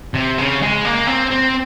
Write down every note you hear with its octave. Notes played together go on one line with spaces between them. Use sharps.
C3
C#3
G#3
A#3
C4
C4